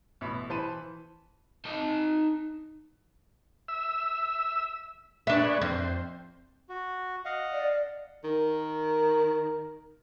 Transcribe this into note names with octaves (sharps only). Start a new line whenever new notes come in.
A1 B2 E5 B5
E3 C5 A5 B5 D#7
D#4 A5
E5 E6
G#3 D4 B4 C#5 E5
F2 C5
F#4
D#5 F5 F#5
D5
D#3 A#4